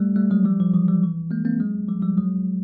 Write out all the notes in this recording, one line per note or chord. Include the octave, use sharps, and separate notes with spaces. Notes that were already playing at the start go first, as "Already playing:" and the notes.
Already playing: G3 A3
G3 A3
F#3 G#3
F3 G3
F3
E3 F#3
F3 G3
E3
G#3 A#3
A#3 C4
F#3 G#3
F3 G3
F3 G3
F#3 G#3